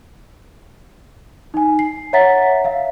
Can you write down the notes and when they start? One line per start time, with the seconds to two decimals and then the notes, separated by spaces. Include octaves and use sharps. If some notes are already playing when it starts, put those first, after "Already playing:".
1.54 D#4 G#5
1.79 C7
2.13 C#5 E5 F#5 A#5 A6 B6
2.64 E5 F5